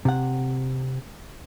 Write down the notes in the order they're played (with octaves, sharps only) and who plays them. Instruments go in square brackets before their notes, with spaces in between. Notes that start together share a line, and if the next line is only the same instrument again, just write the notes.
[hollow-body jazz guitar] C3 F#5